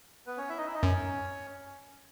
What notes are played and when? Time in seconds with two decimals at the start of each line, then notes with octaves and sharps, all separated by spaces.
0.27 B3 B4
0.38 C#4 C#5
0.49 E4 E5
0.58 D#4 D#5
0.66 E4 E5
0.74 D#4 D#5
0.83 F#2 C#4 C#5